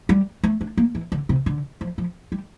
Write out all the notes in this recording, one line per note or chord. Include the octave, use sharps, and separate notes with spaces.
G3
A3
D4
A#3
E3
D3
C3
D3
F3
F3
G3